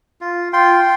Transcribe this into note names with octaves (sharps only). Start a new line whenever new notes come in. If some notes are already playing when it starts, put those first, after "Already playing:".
F4
F4 G5 C6